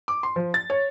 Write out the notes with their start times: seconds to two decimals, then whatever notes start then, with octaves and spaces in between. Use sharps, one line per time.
0.08 D6
0.23 C6
0.36 F3
0.54 A6
0.70 C#5